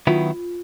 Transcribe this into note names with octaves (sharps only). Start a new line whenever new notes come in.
D#3 F#3 B3 E4 F4